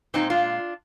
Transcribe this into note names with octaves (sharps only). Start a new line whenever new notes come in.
A#2 F3 G#3 C4 D#4
D4 F4